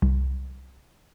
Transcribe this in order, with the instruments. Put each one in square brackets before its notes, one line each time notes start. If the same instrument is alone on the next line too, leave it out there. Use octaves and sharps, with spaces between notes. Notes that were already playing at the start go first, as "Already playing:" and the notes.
[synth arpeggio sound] C2